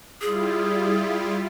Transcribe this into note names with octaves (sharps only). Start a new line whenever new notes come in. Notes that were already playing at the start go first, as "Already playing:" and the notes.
G3 E4 F4 G#4